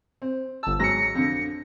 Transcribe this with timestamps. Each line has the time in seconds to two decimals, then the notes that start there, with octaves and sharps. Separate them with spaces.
0.22 C4
0.63 G1 A5 E6
0.79 G#2 F#3 A#6 C#7
1.15 F2 D3